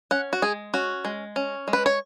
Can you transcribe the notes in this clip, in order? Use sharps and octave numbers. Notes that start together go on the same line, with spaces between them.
C#4 F#5
F#4
G#3 G#4
C#4 F#4
G#3
C#4
G#3
B4
C#5